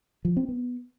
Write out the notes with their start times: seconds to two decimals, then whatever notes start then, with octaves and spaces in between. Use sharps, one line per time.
0.25 F3
0.37 C4
0.49 B3